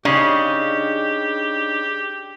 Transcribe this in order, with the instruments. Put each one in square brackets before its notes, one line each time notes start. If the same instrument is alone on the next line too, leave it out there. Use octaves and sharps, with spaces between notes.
[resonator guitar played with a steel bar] C#3 [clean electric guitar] D4 D#4 [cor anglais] G4